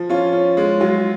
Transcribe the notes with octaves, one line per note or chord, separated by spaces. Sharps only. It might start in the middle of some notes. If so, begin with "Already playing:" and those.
Already playing: F3
C#4 F4
C#4
G#3
F#3 F4